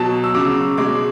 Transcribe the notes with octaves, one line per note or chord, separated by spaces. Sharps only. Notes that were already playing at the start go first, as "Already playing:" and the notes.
Already playing: B2 F#3 A5
E6
C#3 F#3 D6
B2 G#3 D6